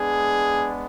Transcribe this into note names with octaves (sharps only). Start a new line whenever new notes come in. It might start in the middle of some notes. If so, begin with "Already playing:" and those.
Already playing: G#3 B3 D4 G#4